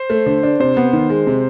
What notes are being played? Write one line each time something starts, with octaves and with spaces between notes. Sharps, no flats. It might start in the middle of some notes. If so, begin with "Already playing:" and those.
Already playing: C5
A3
D3
D4
C3 C5
B3
D#3
G#3
C3